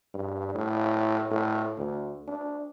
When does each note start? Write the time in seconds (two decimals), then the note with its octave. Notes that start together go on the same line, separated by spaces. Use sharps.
0.14 G2
0.55 A2
1.31 A2
1.78 D2
2.27 D4